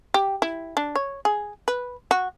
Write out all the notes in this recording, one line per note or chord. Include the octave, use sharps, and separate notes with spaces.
G4
E4
D4
C#5
G#4
B4
F#4